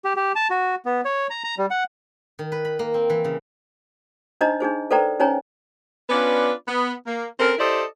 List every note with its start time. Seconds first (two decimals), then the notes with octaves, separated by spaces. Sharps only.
0.05 G4
0.16 G4
0.35 A5
0.50 F#4
0.85 B3
1.05 C#5
1.30 A#5
1.44 A#5
1.58 G3
1.70 F#5
2.39 D#3
2.52 B4
2.65 B5
2.79 A#3
2.94 C4
3.10 E3
3.24 C#3
4.41 D4 D#4 C5 D#5 A#5
4.60 D4 D#4 G#4 C5
4.91 A4 B4 C5 D5 G5 A#5
5.20 C#4 D#4 C5 C#5 G#5 A#5
6.10 B3 C#4 D4 F4 B4 D5
6.68 B3
7.07 A#3
7.40 C4 C#4 A4 A#4
7.58 E4 G4 A4 C5 D5 D#5